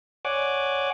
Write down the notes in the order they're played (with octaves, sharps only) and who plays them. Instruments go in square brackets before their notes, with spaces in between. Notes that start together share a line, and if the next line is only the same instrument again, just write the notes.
[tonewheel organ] C#5 D5 F#5 G#5 D6